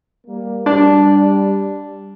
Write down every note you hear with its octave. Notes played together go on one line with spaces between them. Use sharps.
G3 A#3
G3 D4